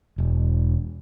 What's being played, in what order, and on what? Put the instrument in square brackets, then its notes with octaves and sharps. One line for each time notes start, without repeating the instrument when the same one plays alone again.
[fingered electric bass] E1